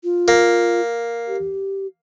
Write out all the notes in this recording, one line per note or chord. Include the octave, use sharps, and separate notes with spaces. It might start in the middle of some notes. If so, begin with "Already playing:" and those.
F4
A#3
G4